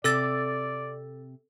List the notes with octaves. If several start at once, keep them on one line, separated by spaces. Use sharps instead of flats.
C3 A4 D5 E6 A6